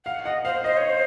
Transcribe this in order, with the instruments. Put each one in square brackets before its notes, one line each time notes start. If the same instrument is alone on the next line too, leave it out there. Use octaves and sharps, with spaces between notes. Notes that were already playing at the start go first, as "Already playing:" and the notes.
[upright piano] F5 [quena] F#5
[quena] D#5 [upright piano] F#5
[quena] C5 [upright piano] F5
[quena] C5 [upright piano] D#5
[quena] C#5
C5